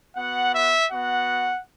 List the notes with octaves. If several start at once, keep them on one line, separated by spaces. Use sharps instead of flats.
B3 F#4 F#5
E5
B3 F#4 F#5